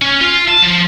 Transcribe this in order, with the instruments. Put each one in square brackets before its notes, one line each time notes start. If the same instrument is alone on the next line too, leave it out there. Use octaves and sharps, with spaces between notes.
[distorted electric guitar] C#4
F4
A5
F3